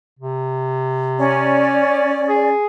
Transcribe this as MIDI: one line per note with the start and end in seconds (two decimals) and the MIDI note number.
0.19 1.89 48
1.18 2.50 61
1.18 2.50 74
2.29 2.67 68